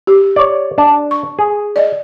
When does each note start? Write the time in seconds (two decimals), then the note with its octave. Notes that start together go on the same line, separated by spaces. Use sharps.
0.07 G4
0.36 C#5 D5
0.78 D4 A5
1.11 C#6
1.39 G#4
1.76 D5 D#5